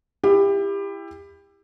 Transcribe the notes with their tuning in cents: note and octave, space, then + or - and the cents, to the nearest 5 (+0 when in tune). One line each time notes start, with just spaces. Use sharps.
E4 +15 G4 +25